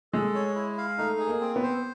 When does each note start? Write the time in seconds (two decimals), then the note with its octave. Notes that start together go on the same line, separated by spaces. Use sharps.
0.13 G#3 A4
0.35 C#5
0.56 E4
0.78 F5
0.98 A3 D#4
1.19 G#4
1.28 A#3
1.41 C4
1.56 B3
1.63 C5